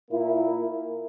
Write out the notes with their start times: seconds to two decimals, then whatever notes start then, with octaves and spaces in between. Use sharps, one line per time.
0.10 A#2 A#3 E4 A#4